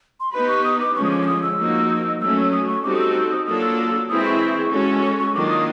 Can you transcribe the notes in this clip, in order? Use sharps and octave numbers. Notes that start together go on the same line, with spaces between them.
C6
B3 D#4 G4 B4 B5
C#6
D#6
D6
D3 F3 G#3 C#4 C#6
D#6
D6
D6
D#6
E6
F3 A#3 D#4 F#4
F#3 A3 C#4 E6
D#6
C#6
G3 C4 D#4 F#4 A4 D6
D#6
E6
E6
D#6
F#3 A#3 D4 F4 A4 D#6
E6
E3 G#3 C4 E4 G#4 D#6
C#6
G#3 C#4 F#4 A4
C#6
C#6
D#3 F#3 A#3 D4 F4 D6
D#6